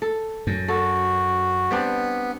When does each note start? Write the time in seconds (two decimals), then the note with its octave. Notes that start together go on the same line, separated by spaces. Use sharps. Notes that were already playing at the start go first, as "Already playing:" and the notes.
0.02 A4
0.47 F#2
0.68 F#4 A4
1.71 G3 B3 C4 D4